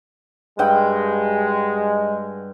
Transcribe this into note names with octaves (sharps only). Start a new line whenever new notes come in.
G2 G#3 F#5 G5